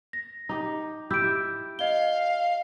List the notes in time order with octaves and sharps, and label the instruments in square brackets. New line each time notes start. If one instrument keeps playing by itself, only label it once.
[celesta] A#6
[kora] D#4 G4
[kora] E4 G4 E5 [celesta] G6 D7
[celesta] D#5 G7 [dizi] F5